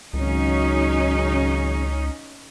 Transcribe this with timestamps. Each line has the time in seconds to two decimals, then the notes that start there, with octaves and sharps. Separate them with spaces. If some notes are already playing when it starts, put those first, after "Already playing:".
0.14 G#1 C#2 C#3 F#3 C#4 D#4